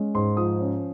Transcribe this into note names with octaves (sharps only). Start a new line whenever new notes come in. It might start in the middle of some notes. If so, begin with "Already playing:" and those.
Already playing: G#3 C#4
G#2 C6
F3 D#6
C#4